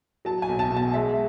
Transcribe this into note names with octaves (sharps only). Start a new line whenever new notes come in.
F#3 A5
G#5
B1
A5
B2
A5
G#3 E5